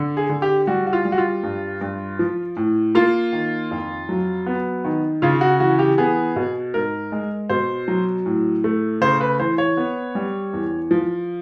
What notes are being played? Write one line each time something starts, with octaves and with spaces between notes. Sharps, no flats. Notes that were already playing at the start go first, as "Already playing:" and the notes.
Already playing: D3
G#4
D3
G4
G3 F#4
F#4
F4
G3
F#4
F4
G2
G2
F3
A2
A#3 F4
D#3
F2
F#3
B3
D#3
C#3 F4
F#4
E3 F#4
G4
B3 G#4
B2
G#2 A#4
G#3
B2 C5
F#3
A2
A3
C#3 C5
B4
E3 C5
C#5
B3
G3
E2
F3